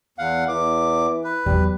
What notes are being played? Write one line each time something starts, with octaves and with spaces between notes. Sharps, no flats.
E2 F5 F#5
E2 E3 D6
B4
E2 F#3 G3